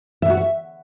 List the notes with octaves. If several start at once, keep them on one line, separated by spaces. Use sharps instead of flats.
E5
F#4
E5